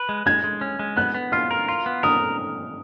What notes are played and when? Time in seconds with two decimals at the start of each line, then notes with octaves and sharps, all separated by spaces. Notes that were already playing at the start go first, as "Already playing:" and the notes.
Already playing: B4
0.09 G#3
0.26 G#3 G#6
0.44 G#3
0.61 C#4
0.79 G#3
0.97 B3 F#6
1.14 B3
1.32 F4 F6
1.51 A#4
1.68 F4
1.86 B3
2.03 A#4 D#6